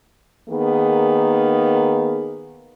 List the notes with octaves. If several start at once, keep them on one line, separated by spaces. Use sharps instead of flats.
D#3 A#3 B3 G#4